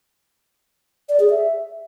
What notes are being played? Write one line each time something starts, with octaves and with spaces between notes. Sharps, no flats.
D5
G#4
E5